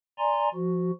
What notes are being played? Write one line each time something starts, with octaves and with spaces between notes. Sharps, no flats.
D5 G#5 A#5 C6
F3 F#4